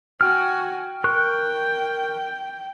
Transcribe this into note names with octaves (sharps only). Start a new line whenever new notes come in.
F#4 G5 G#5 F6
A#4 G5 C#6 F#6